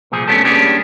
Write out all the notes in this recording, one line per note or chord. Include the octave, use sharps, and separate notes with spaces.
C2 A#2 F3 G#4
A3 B3 C#4 D4 G4 A4
G3 A#3 C#4 D4 G4 G#4